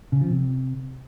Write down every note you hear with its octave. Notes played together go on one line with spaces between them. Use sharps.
C#3
F3
C3